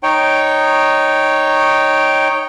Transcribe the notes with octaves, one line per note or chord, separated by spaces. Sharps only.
D#4 C#5 G5